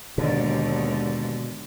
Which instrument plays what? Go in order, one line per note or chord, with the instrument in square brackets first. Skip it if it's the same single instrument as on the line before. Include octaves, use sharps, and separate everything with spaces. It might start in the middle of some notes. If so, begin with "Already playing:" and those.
[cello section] D#2 G#2 D3 [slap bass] B2